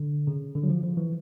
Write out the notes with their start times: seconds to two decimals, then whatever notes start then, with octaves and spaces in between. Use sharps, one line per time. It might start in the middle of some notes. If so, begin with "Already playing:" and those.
Already playing: D3
0.27 C#3
0.55 D3
0.63 F#3
0.69 F3
0.84 F3
0.97 E3